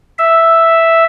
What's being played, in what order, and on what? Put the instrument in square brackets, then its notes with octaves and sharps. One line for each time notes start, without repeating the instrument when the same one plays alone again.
[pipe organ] E5